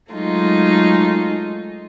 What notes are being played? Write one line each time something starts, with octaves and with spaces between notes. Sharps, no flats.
F#3 G#3 A3 D#4 F4